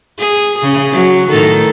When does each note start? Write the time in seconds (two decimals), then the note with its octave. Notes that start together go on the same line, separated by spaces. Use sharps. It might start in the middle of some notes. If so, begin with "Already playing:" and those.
0.20 G#4
0.59 C#3 G#4
0.92 F#3
1.30 A2 D#3 A4